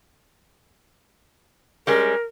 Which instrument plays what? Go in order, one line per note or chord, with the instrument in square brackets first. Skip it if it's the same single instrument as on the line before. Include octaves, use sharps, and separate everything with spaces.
[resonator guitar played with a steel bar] G3 G#3 C#4 [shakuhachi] A#4